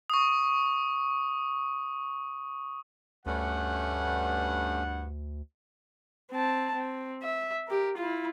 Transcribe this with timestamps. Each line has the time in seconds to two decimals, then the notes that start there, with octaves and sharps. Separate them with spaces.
0.10 C#6 D#6
3.26 D2 G2 A3 C#4 F#5
6.32 C4 A5
6.75 C4
7.23 E5
7.68 G4 A#4
7.97 E4 F4